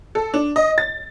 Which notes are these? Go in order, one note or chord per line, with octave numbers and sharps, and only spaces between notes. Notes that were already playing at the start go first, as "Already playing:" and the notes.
A4
D4
D#5
A6